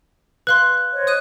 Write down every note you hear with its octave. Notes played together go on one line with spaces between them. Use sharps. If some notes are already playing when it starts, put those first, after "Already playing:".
B4 F5 C6 F#6
C5 C#5 D#5
D#6 F#6 D#7